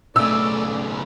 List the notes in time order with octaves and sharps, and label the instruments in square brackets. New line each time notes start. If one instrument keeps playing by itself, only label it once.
[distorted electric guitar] B1 C#3 [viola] A3 D5 [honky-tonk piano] E6